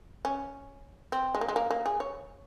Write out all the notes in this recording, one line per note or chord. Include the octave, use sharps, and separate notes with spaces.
C#4
C4
G#3
A#3
G#3
A#3
A#3
G#4
C#5